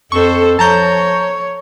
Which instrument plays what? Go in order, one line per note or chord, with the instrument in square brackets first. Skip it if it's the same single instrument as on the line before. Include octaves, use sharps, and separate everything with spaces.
[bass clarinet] F2 [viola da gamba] A4 C5 [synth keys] C#6
[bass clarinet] F3 [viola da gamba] C#5 [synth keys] A5 A#5 G6